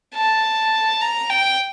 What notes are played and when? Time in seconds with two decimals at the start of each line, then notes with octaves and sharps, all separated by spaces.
0.15 A5
1.01 A#5
1.30 G5